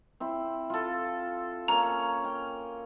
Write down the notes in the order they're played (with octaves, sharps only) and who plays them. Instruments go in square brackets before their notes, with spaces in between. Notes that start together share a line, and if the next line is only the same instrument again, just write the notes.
[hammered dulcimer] C4 E4
F4 A4
[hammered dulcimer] A#3 C#4 [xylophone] A#5
[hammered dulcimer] G5